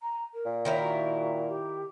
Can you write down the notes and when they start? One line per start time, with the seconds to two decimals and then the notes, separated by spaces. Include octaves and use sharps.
0.01 A#5
0.34 A#4
0.46 A#2
0.65 D#3 E4 A#4 C#5
0.80 F#4
1.48 G4